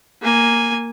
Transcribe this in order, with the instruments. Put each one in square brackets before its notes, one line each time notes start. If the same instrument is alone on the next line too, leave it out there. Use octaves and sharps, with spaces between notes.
[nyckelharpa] A#3 G#5